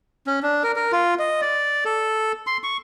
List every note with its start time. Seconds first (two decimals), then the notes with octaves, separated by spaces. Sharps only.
0.27 C#4
0.43 D4
0.64 A#4
0.76 A#4
0.92 F4
1.19 D#5
1.42 D5
1.85 A4
2.47 C6
2.64 C#6